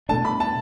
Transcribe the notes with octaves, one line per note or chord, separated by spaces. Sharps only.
B2 A3 D4 A5
B5
A5